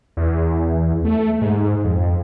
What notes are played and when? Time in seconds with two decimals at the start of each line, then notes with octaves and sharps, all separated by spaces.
0.17 E2
1.05 A3
1.41 G#2
1.84 F2